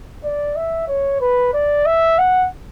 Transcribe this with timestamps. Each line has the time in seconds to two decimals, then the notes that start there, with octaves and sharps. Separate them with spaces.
0.24 D5
0.56 E5
0.88 C#5
1.21 B4
1.54 D5
1.86 E5
2.18 F#5